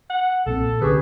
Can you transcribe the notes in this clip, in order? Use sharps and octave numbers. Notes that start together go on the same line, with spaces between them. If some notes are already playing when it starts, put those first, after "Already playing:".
F#5
B1 A#2 C4 A4
A#2
C2 D3 C#4 G4 G#4 B4